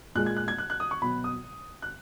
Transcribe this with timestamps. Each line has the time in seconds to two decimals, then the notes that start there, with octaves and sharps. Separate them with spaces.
0.15 A#2 G#3 F#6
0.26 G#6
0.37 F#6
0.48 G#6
0.58 F#6
0.70 F#6
0.80 D#6
0.91 C#6
1.02 B2 F#3 B5
1.24 D#6
1.82 F#6